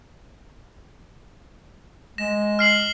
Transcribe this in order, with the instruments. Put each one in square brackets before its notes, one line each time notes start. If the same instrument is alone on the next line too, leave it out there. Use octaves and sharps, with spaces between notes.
[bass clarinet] G#3 [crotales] A#6 E7
[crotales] F6 C7 F#7